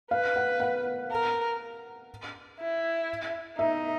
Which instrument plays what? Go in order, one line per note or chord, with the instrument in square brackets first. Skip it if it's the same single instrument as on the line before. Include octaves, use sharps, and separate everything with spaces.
[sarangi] B4 [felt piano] F5
[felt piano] F#5
F#5
[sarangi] A#4
E4
[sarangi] D#4 [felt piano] E5